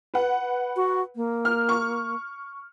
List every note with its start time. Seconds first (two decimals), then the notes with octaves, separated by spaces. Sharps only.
0.14 B4 F#5
0.76 F#4
1.16 A#3
1.45 F6
1.69 C#6